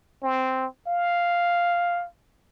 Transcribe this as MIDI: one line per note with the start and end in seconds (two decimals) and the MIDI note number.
0.23 0.66 60
0.87 2.07 77